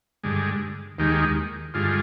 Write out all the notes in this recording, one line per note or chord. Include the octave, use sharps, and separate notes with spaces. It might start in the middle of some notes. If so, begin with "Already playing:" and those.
G2 D3 G#3
D#2 D#3 G#3 G4
G2 D3 G#3 F4